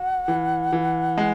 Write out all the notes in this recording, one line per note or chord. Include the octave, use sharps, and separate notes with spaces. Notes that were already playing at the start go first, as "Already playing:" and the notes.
Already playing: F#4 F#5
E3
E3
G#3